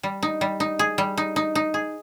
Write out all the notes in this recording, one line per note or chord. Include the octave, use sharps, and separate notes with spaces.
G3
D#4
G3
D#4
G#4
G3
D#4
D#4
D#4
G#4